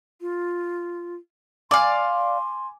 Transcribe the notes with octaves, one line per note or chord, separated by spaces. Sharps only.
F4
D5 F5 G#5 C6 D6